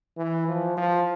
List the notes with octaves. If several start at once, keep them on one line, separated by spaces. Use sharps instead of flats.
E3
F3
F3